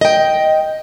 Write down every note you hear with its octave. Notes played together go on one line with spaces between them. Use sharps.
D#5 G5